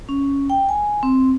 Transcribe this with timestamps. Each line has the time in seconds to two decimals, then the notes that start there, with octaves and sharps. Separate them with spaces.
0.09 C#4
0.50 G5
0.69 G#5
1.03 C4